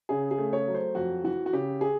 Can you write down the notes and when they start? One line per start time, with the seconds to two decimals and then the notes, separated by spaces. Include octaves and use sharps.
0.09 C#3 G#4
0.31 G#4
0.38 A3
0.53 C#5
0.67 F#3
0.75 C5
0.95 F2 F#4
1.24 E3 F#4
1.46 F#4
1.53 C#3 G4
1.81 G#4